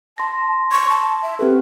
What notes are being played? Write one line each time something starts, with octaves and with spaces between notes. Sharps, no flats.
A5 C6 A#6
C#6
A5
E5
C4 G4 A4 B4